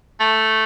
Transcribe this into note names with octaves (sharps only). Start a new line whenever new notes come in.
A3